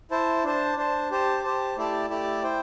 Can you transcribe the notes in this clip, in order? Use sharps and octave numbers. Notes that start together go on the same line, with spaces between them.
E4 C5 A5
D4 C5 A5
D4 C5 A5
G4 C5 A5
G4 C5 A5
A3 E4 G4 D5 A5
A3 E4 G4 D5 A5
E4 C5 G5